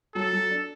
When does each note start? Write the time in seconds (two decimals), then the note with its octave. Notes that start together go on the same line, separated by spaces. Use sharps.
0.15 F#3 A4
0.33 F#3
0.50 D4